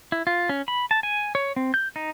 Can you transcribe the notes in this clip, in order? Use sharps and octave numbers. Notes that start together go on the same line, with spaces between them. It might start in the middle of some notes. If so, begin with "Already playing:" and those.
E4
F4
C#4
B5
A5
G#5
C#5
C4
G6
D#4